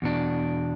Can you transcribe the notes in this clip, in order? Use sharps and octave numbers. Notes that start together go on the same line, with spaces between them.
E2 B2 D4